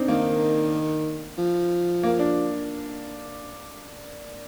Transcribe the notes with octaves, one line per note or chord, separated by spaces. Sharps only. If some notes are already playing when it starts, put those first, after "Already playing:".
Already playing: C4 D4 D#4
D#3 A#3
F3
A#3
D4